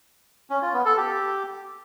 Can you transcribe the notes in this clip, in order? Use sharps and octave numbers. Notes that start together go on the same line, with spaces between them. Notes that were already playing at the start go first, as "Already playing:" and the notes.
C#4
F4
B3
A4
G4